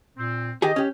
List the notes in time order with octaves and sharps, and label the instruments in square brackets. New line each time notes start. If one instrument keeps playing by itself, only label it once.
[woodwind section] A#2 C4
[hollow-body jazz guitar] D#3 G4 G#4 [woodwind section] D#5
[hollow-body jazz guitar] C#4 G4